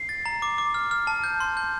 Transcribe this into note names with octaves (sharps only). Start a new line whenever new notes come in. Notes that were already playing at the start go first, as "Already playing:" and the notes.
Already playing: C7
A6
A#5
D6
D6
F6
F6
A5
G6
C6
G6